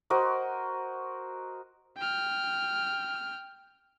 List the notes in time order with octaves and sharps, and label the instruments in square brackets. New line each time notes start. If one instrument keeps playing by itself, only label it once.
[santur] F#4 A#4 C5 D#5
[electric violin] G5 F6